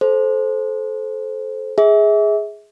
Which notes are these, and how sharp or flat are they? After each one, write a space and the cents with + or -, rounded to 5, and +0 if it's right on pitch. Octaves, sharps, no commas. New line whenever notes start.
A4 -20 C5 +0
G#4 +0 E5 -30